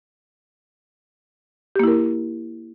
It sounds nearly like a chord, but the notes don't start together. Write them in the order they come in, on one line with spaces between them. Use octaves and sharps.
G4 A#3 E4 A#4